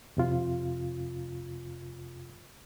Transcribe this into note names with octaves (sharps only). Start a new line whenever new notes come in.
F2 C3 F4